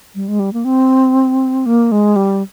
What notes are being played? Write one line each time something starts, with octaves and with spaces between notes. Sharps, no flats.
G3
G#3
G3
A#3
C4
A#3
G#3
G3